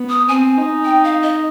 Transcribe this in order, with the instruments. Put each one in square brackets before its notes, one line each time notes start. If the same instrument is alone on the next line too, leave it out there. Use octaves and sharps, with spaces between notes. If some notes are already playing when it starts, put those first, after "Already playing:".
Already playing: [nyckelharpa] B3
[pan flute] D#6
[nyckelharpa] C4 [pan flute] G#5
[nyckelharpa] D#4
[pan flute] G5
F5
D#5